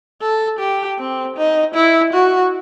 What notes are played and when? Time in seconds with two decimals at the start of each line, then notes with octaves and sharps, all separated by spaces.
0.21 A4
0.59 G4
0.98 C4
1.37 D#4
1.75 E4
2.13 F#4